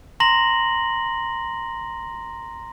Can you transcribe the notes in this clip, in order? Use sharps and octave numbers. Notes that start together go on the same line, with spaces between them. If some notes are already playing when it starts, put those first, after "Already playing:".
A#5 C6 A#6 F#7